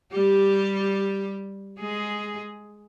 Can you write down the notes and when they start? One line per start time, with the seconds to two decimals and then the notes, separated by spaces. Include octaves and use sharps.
0.12 G3 G4
1.79 G#3 G#4